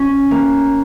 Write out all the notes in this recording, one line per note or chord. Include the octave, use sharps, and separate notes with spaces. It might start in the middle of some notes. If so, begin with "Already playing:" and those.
Already playing: C#4
A#3